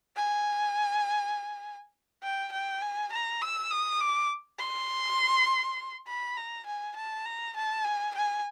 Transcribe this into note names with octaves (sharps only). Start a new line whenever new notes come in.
G#5
G5
G5
G#5
A#5
E6
D#6
D6
C6
B5
A#5
G#5
A5
A#5
A5
G#5
G#5